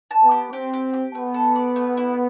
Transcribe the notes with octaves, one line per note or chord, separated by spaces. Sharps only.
A5
B3
G4
C4 G4
G4
G4
A3 B3
A4
D5
A3
E4